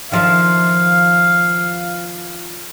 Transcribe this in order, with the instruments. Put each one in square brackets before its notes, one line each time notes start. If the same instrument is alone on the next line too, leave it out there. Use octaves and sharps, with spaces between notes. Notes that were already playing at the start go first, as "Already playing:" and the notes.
[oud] D#3 F3 E5 [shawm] F5